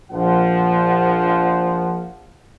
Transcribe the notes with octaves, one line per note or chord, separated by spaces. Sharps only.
A#1 F3 F#5